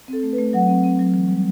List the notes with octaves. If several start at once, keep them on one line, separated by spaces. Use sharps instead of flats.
C4 A4
A3
B4
A3
F#3 F#5
C4
C4
F#3
E3
G3